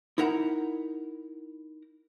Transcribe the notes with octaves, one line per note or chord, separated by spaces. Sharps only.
D#4 E4 A#4 F#5 A#5